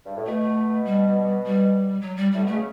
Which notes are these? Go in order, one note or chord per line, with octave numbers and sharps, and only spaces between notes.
G2
A2
B2 A3
G3
G3
F#3
G3
A2 G3
B2 A3
C#3